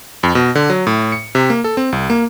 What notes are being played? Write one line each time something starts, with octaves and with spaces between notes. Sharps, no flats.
F2
B2
D3
F#3
A2
C#7
C3
A#3
A4
C4
C2
A#3